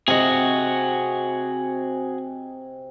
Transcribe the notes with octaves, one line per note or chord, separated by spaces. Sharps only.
C3 F#4 G#4 D#5